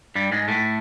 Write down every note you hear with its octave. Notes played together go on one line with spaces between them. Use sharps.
G2 G3
G#2 G#3
A2 A3